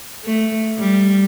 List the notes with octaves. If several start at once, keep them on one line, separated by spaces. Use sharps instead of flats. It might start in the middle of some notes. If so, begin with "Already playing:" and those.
A3
G3